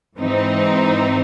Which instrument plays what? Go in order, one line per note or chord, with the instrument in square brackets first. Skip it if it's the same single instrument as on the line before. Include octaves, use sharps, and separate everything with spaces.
[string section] G#2 E3 C4 D#4